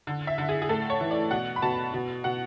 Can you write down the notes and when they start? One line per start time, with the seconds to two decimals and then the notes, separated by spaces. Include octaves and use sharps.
0.07 D3
0.27 E5
0.38 D3
0.49 G#4
0.62 G#4
0.69 A2 A4
0.90 C#5
1.01 E3
1.11 D5
1.31 B2 F#5
1.56 B5
1.62 B2 A5
1.94 B2
2.24 B2 F#5